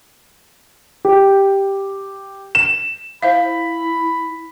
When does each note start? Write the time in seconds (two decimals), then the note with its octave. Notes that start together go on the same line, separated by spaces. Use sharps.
1.05 G4
2.55 E7
3.23 E4 C5 E5 F5 B5